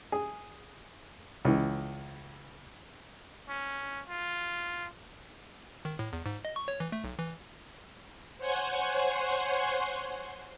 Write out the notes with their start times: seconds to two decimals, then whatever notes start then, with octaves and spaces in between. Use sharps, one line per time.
0.12 G#4
1.45 C#2 E3
3.49 C#4
4.09 F4
5.85 D#3
5.99 A2
6.13 E2
6.26 G#2
6.45 D#5
6.56 C#6
6.68 C#5
6.80 E3
6.92 A3
7.04 B1
7.19 E3
8.38 C5 C#5 F#5 G#5 C6 C#6